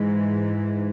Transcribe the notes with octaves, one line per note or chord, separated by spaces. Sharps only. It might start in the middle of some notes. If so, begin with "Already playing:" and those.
Already playing: G#2 E3